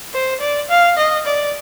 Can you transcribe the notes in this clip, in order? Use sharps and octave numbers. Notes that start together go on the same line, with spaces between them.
C5
D5
F5
D#5
D5